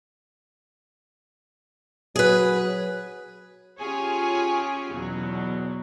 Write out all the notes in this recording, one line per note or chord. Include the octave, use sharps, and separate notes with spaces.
F#3 G#4 B4
C#4 F4 G4 G#4 C#5
E2 B2 F#3